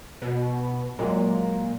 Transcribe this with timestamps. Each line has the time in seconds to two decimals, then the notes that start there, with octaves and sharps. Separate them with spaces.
0.22 B2
0.99 A#2 F#3 G#3 A#3